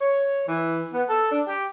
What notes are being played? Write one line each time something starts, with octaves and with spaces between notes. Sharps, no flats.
C#5
E3
B3
A4
D4
G4